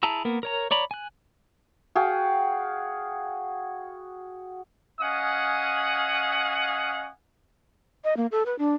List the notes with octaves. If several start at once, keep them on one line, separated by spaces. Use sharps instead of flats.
E4 G#4 A5 A#5 E6
A#3 B3 A#4
A#4 C#5 A#5
C#5 D5 A#5 B5
G#5 F#6
F#4 G#4 F5 G5
C#4 D#5 F5 F#5 G#5 D#6
D#5
A#3
A4
B4
D4